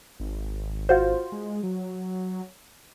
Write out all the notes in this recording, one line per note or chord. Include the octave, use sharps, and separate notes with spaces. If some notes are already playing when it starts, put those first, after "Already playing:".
G#1
F4 F#4 C5
G#3
F#3